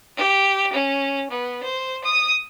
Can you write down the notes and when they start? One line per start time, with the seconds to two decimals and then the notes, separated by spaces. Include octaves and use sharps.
0.16 G4
0.72 C#4
1.30 B3
1.63 C5
2.03 D#6